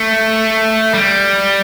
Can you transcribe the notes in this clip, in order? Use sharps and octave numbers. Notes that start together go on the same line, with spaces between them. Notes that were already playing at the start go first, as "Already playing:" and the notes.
Already playing: A3
G3